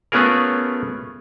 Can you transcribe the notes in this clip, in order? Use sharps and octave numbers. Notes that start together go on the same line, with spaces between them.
A3 B3 C#4 F4 G#4 A#4